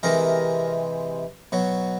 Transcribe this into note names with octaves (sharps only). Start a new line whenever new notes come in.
C3 E3 G#3 A#4
B2 F#3